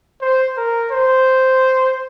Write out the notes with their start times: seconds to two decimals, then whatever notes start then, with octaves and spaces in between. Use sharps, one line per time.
0.21 C5
0.57 A#4
0.92 C5